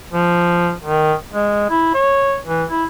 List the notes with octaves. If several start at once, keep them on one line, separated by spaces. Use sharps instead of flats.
F3
D#3
G#3
E4
C#5
E3
E4